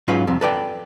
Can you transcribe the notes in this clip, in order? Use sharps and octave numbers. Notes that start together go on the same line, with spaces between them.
G#2 F#3 C#4 F4 B4 F5
C2 F2 C3
A4 B4 D5 G5